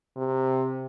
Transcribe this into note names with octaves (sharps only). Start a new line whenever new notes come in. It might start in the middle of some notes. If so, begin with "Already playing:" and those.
C3